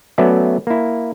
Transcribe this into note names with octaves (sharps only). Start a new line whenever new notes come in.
F#3 A3 B3 C#4 D5 E5
A#3 E4